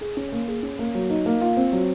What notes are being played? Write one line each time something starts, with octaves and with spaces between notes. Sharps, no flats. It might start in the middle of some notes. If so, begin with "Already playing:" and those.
G#4
C#4
A#3
G#4
C#4
A#3
F#3
D#4
A#3
F4
C4
F#3